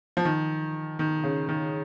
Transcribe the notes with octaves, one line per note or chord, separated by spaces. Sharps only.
F3
D#3
D#3
C#3
D#3